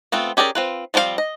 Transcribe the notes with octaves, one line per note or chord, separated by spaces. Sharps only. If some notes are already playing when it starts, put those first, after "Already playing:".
A3 B3 C4 F4
C#4 G4 G#4 A#4 D5
C4 F4 B4
F3 G3 C4 D#4 F5
D#5